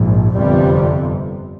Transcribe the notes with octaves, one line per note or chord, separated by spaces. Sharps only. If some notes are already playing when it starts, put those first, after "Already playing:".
Already playing: A#1 G#2
G1 F2 C3 G3